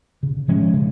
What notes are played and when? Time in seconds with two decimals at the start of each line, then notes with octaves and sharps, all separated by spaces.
0.23 C#3
0.48 F3 G#3 C#4
0.73 C#3